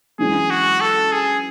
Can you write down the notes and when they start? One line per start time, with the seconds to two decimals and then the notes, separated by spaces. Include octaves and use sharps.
0.18 F#2 E3 G#3 D4 G#4
0.50 F#4
0.81 A4
1.12 G#4